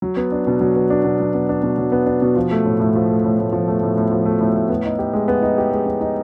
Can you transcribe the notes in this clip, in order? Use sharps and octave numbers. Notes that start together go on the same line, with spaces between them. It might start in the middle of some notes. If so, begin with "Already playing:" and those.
F#3
B3
D4
B2
F#3
B3
D4
B2
F#3
B3
D4
B2
F#3
B3
D4
B2
F3
A3
A2
A2
F3
A3
A2
A2
F3
A3
A2
A2
F3
A3
A2
A2
B3
D#4
G4
G#3
B3
D#4
G4
G#3
B3
D#4